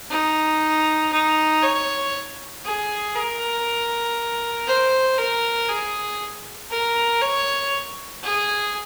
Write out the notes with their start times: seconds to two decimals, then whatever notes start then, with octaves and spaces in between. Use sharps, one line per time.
0.11 D#4
1.12 D#4
1.63 C#5
2.65 G#4
3.15 A#4
4.67 C5
5.18 A#4
5.69 G#4
6.71 A#4
7.21 C#5
8.23 G#4